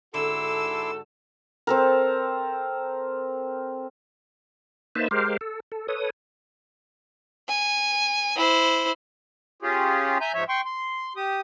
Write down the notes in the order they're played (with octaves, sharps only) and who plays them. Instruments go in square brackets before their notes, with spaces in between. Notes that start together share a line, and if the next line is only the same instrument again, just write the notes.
[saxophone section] G#2 F#4 A4 [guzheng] D3 [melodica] E4 C6 D6 [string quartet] E6
[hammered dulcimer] C4 A4 A#4
[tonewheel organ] A#3 D#4 B4 C5 E5 A5
G#3 G4 A#4 C5 F5
A4
A4
A4 B4 C#5 D#6
[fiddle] G#5
E4 C5
[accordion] C#4 F4 G4 G#4
E5 G#5 A#5 G6
G#2 F3 C#5 E5
G5 C6 C#6
C6
G4 D#6